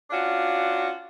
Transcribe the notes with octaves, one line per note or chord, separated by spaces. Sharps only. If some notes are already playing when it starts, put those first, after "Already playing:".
C#4 D4 F4 F#4